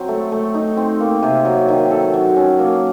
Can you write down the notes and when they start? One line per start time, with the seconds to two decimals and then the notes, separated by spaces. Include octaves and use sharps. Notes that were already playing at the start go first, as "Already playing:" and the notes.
Already playing: F#3 C4
0.08 A3
0.32 A3
0.54 D#4
0.77 C4
1.00 A#3
1.23 C3
1.45 F#3
1.68 D#3
1.91 A4
2.14 F#3
2.36 C#4
2.59 A#3